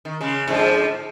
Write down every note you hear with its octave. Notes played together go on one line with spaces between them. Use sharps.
D#3
C#3 G#3
G#2 D3 F3